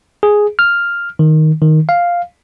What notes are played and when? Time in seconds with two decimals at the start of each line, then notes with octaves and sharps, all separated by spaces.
0.23 G#4
0.59 F6
1.19 D#3
1.62 D#3
1.89 F5